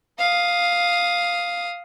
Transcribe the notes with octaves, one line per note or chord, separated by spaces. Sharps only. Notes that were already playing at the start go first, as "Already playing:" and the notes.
F5 D#6